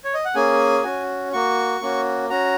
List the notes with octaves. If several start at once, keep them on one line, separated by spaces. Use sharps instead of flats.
C#5
D#5
F#5
A#3 C#4 G#4 G#5
C#4 F#4
A#3 F#4 C#6
A#3 C#4 F#4
C#4 F#4 A#5